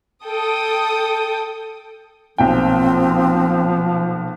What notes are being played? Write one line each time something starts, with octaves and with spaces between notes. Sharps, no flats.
A4 G5 D#6
B1 A#2 F3 C4 G5